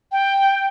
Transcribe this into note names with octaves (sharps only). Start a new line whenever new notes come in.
G5